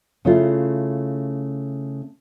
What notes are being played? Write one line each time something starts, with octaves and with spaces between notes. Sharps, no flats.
C#3 A3 C#4 E4 F4